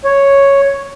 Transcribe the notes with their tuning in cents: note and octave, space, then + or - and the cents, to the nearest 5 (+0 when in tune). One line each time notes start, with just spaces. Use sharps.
C#5 +0